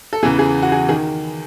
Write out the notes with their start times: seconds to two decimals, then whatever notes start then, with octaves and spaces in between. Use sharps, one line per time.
0.13 A4
0.23 E2 C#3 E3 G#4
0.39 G#4
0.62 F#4
0.72 G#4
0.89 D#3 G#4